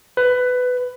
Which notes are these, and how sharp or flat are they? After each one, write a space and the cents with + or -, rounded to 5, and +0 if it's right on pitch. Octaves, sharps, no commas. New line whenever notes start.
B4 +15